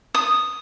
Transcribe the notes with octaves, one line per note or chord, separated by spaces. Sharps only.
D#6